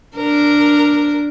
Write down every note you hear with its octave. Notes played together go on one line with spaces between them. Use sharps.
D4 A#4